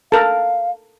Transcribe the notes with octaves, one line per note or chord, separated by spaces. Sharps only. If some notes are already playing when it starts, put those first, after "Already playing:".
A4 A#4 F5